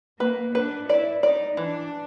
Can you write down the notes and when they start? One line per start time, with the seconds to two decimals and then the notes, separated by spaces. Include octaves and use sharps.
0.20 A#3 B4
0.55 D4 B4
0.89 E4 D5
1.22 D#4 D5
1.57 E3 D4